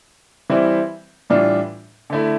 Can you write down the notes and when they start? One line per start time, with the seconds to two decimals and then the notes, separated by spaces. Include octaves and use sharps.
0.50 E3 G3 C4 E4
1.30 A2 E3 G3 D4 F4
2.10 D3 A3 E4